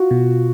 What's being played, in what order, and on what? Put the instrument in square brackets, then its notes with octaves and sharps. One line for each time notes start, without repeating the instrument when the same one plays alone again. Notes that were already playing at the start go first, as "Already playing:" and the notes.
Already playing: [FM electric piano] F4 [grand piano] F#4
[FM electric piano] B2